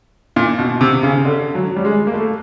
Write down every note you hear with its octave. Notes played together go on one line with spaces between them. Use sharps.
A#2
B2
C3
C#3
D3
F#3
G3
G#3
A#3
A3